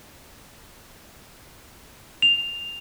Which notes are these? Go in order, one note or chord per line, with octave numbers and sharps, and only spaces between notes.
F7